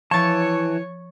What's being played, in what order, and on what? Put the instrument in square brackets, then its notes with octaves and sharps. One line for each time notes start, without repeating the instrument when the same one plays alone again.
[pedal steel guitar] E3 A5 [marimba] F3 [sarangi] C#5 [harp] C#6 A6 C#7